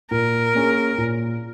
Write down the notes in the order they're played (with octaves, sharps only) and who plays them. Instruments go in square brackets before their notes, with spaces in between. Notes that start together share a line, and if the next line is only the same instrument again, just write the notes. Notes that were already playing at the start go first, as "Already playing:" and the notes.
[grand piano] A#2 [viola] A#4
[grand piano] A#3 C#4 G#4
A#2